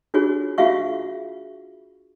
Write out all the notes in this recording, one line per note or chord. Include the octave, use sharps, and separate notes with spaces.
D4 F4 F#4 G#4 C#5
F4 F#4 G#4 E5 F5 C#6